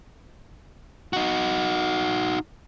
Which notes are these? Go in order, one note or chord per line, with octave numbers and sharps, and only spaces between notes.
D#4 F#4